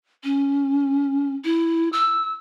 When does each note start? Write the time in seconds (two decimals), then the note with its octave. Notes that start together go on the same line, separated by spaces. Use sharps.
0.24 C#4
1.45 E4
1.93 E6